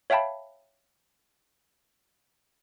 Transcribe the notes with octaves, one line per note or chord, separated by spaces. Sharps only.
C#5 E5 F5 G5 A5 B5